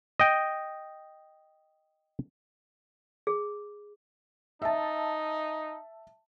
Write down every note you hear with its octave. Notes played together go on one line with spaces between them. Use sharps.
D#5 G5
G#4
D#4 E5 A5